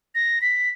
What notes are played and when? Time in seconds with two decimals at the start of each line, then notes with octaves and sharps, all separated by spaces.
0.15 A#6
0.41 B6